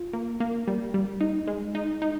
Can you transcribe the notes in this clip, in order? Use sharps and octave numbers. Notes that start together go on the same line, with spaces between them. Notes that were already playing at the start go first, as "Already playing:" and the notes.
Already playing: F4
A#3
A#3
G3
G3
D#4
G#3
D#4
D#4